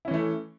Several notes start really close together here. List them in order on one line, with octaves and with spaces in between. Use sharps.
E4 C#4 E3 A3